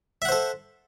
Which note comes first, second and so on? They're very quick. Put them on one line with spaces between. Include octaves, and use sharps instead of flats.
E5 F#5 C5 A4